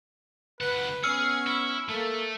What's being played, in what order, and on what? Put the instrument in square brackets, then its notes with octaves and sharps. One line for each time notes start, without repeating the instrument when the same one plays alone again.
[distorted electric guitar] C#2 F#5 [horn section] B4
[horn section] B3 C#4 [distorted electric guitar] G#4 [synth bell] E6 F6 C#7
[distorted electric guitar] E4
[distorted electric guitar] A3 [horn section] A#3 A4